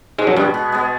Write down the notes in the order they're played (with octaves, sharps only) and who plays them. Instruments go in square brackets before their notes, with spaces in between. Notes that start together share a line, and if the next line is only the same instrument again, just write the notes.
[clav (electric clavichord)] G#2 G#3 [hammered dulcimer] B2
[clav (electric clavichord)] F#2 F#3
[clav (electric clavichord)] G2 G3 [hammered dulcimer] G#3 B3
[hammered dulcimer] B2
G#3 B3